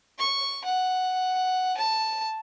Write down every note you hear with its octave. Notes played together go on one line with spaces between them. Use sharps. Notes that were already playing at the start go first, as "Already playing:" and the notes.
C#6
F#5
A5